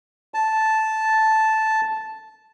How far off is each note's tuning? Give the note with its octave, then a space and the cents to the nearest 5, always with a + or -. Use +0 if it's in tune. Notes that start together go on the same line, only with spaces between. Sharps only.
A5 -5